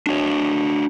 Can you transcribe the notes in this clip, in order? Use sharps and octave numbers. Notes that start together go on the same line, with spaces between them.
D4 F#4 C#5